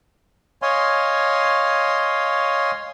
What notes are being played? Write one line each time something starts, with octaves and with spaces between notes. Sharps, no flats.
C#5 D#5 F5 G#5 C6